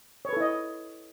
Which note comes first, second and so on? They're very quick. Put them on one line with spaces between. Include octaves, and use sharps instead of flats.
C#5 B4 A4 E4 D#5